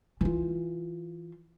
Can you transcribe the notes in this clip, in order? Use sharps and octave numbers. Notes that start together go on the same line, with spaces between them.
E3 F4